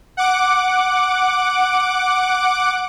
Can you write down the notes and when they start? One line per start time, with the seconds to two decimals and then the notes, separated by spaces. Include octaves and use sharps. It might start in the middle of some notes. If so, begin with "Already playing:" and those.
0.17 F#5 D6